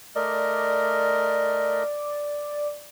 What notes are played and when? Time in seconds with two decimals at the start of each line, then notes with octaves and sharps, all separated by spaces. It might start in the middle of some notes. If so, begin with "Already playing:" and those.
0.16 A3 A#4 D5 D#5